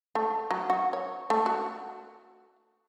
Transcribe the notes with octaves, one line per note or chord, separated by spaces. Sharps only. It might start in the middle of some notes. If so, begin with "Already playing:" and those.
A3
F#3
F#4
C#5
A3
F#4